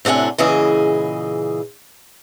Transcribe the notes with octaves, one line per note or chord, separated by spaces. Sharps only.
A2 C3 D4 F#5 G#5
A#2 C#3 E3 G#4 D#5